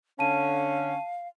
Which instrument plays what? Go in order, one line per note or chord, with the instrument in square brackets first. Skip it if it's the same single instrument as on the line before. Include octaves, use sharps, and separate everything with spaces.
[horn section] D3 C#4 [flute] F5 [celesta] A5 D#7